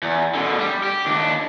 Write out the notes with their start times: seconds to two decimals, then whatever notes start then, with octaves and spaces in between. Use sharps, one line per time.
0.03 E2
0.34 B2 D3
0.59 G3
0.83 G4
1.07 D#2 D4